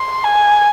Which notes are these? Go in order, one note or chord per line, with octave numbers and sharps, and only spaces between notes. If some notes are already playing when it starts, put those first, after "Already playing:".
Already playing: C6
G#5